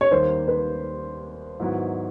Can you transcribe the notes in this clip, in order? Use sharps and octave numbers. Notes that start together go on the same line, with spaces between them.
C#5
D#2 D#3 G3 A#3 C5
B4
G#2 D#3 F#3 B3 E4